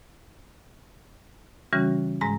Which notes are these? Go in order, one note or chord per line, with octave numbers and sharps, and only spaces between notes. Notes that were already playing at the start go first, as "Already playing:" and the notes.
C#3 E3 G3 C#4 F#4
G#2 G#3 A#5 A#6